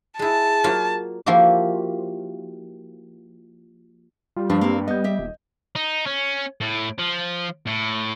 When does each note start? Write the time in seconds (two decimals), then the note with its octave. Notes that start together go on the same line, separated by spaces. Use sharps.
0.19 G#3 E4 A5
0.64 F#3 A#3 F4
1.26 F3 A#3 E4 F#4 G4
4.36 G3 F4
4.50 G2 F3 D4
4.61 A#3 C4
4.88 B3 D#5 G6
5.04 G4 E5
5.19 D#1
5.76 D#4
6.06 C#4
6.61 A2
6.99 F3
7.67 A2